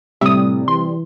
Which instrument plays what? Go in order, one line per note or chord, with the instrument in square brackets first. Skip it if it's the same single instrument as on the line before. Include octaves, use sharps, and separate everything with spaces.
[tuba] A2 [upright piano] C3 [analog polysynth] G3 [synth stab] E5 D#6
[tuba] E3 [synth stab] C6